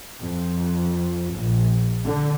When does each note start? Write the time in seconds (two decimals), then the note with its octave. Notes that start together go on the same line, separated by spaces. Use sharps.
0.20 F2
1.33 A#1
2.04 D3